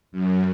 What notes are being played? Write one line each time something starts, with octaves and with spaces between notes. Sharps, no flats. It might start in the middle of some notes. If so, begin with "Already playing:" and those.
F#2